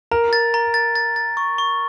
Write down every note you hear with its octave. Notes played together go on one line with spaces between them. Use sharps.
A#4 A#5
A6
A#5
A6
A6
A6
C#6
C#6